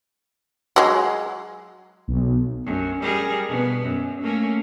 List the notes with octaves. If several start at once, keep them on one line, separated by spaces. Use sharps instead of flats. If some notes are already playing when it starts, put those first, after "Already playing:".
F#3 G#3
B1
F#2
G3 G#4 A#4
B2 B3
F#2
A3 A#3 C#4